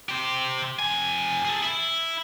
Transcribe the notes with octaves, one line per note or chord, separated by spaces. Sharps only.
G4 C5
F2 G#5
G#4 A4
E4